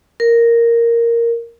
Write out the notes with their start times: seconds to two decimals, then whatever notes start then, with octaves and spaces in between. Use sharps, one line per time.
0.20 A#4